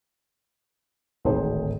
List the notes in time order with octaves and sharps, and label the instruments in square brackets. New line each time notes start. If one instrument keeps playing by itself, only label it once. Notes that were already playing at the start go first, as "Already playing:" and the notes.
[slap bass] D1 G#1 [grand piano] D#4 G#4 C5